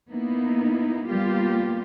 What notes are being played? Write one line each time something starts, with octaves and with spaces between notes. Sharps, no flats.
A#3 B3 D#4 E4
G3 A#3 B3 F4 G4